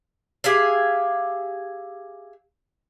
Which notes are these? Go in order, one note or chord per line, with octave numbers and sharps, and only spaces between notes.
G4 G#4 E5 F5